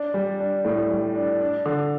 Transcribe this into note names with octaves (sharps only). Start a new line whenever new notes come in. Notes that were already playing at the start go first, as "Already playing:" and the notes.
Already playing: D4
G3
D4
A2
G3
D4
D4
D3